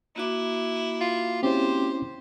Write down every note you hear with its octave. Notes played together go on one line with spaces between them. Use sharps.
A#3 E4 F#4 D6
F4
C4 C#4 E4 G4 C5